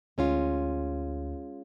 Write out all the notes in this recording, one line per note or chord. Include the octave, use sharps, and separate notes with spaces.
D2 G#3 C#4 F4